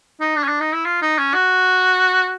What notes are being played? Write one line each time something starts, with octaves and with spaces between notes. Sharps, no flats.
D#4
D4
C#4
D4
D#4
E4
F4
D#4
C#4
F#4